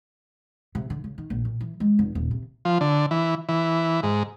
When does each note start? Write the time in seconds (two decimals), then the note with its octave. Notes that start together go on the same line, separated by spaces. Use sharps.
0.75 C3
0.90 D3
1.04 C#3
1.18 D#3
1.30 A#1
1.45 A#2
1.61 E3
1.80 G#3
1.99 F1
2.15 D#1
2.31 C3
2.65 F3
2.81 D3
3.11 E3
3.49 E3
4.03 G#2